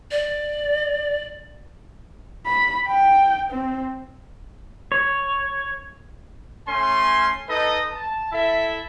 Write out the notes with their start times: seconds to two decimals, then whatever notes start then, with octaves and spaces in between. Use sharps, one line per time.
0.11 D5
2.46 B5
2.87 G5
3.51 C4
4.92 C#5
6.66 A3 C#4 G#5 C6
7.48 D#4 A4 B4 D#5
7.92 A5
8.32 E4 A4 E5